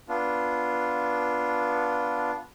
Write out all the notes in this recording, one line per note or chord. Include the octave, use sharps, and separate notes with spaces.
B3 D4 F4